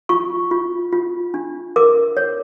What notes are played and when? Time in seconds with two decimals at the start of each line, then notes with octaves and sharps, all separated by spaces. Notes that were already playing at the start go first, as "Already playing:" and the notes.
0.09 F4 C#6
0.51 F4
0.92 F4
1.34 D4
1.76 A#4 D6
2.17 C#5